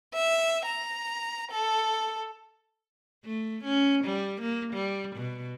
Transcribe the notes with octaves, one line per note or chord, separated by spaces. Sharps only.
E5
A#5
A4
A3
C#4
G3
A#3
G3
B2